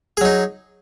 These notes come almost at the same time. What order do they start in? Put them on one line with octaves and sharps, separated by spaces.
G#4 F#3 D#4